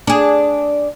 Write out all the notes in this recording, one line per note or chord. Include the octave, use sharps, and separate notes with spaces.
D4 G#4